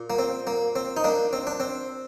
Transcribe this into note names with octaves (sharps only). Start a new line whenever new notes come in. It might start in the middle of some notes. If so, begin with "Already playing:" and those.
Already playing: A#2
A#3
C4
A#3
C4
D#4
A#3 D4
C4
D4
C4